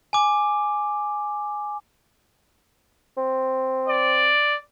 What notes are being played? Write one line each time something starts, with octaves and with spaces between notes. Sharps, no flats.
G#5 D6
C4
D5